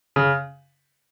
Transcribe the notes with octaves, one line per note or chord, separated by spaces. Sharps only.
C#3